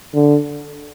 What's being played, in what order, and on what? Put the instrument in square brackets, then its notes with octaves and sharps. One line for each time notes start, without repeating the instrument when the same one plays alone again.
[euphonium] D3